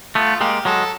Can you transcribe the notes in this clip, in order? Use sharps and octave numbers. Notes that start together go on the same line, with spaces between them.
A3 B3 F4
G#3 A#3 G4
F#3 G#3 A4